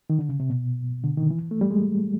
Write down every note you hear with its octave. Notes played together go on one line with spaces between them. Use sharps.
D#3
D3
C#3
C3
B2
D3
D#3
E3
A3
G3
G#3